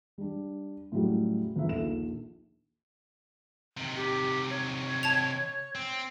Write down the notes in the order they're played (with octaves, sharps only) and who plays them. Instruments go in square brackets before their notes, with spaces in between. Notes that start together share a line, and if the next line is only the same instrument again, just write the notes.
[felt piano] G3 D4
A2 C#3 F#3 G3 F#4
G1 C#3 B3 E5
A#1 D#2 A4 E7
[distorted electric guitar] C3 D#3
[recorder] G4
C#5
[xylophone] A5 G#6 F7
[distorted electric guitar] C4